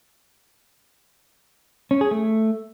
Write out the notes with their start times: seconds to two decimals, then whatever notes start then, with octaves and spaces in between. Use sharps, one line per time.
1.91 C#4
2.01 G#4
2.11 A3